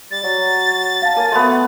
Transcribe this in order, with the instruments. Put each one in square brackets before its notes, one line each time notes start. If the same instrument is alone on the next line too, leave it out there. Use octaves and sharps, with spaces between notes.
[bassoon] G3 [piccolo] A6
[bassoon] F#3
[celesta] F5 A5
[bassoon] A#3 [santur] G#5
[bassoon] F#3 [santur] A3 B3 [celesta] C6